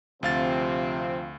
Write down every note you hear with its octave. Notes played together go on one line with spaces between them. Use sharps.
D2 C3 F3 C4 F5 A6